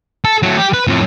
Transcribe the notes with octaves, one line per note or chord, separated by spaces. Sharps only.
A4
F#3 A3
G4
B4
F2 A2